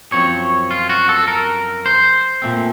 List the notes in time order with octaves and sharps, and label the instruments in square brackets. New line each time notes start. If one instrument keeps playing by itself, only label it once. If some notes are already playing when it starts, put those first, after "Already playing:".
[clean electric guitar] F#2 F3 C4 C#5
F4
F#4
A4
A#4
C5
A#2 A3 C4